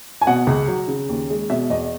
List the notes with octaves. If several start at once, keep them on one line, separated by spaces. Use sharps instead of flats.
G#5
B2 F#5
C#2
F#3
C#3
D#2
G#3
B2 E5
E2 D#5